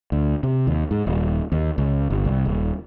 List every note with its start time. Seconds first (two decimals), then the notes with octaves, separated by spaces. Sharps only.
0.12 D2
0.43 C3
0.67 D#2
0.91 G#2
1.07 D#1
1.52 D#2
1.78 C#2
2.10 G1
2.25 C2
2.46 D#1